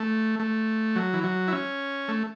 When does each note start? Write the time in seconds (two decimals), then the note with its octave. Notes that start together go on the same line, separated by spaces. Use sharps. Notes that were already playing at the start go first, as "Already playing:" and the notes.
Already playing: A3
0.39 A3
0.96 F#3
1.13 E3
1.23 F#3
1.48 E4
1.52 C#4
2.08 A3